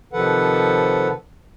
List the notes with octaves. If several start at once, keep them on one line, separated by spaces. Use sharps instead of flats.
C3 D#3 F3 A4 B4 F#5